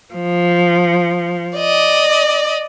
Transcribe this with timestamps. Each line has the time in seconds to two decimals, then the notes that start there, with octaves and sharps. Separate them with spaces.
0.14 F3
1.56 D5 D#5